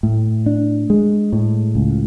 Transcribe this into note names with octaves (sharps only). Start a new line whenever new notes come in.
A2
D4
G#3
A2
C#2